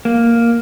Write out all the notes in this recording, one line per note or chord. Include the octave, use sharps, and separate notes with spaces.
A#3